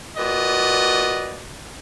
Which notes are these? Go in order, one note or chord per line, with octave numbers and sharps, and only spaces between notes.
A#2 F#4 B4 D5 D#5